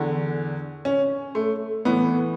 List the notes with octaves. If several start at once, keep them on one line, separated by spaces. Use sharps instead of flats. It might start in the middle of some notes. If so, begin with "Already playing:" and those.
Already playing: E2 D3
C#4
A3
A2 E3 B3